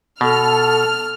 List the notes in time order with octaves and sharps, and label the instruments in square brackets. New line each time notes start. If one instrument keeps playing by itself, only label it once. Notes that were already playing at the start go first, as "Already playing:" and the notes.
[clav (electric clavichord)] B2 [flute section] A4 [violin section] F6